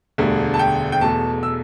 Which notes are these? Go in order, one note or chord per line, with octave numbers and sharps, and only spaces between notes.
E1 D2 D3 G3
A5
G5
G5
E1 E2 B2 A3 A5
E6